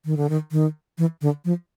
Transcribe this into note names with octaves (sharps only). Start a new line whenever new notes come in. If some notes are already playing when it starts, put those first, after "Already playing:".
D#3
D3
D#3
D#3
E3
D3
F3